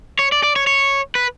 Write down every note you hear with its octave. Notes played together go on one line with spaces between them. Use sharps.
C#5
D5
D5
C#5
C#5
B4